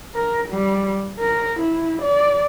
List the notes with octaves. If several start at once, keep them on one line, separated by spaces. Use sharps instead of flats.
A#4
G3
A#4
E4
D5